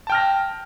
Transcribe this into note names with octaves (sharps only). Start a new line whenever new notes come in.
G5 A5 F6 A#6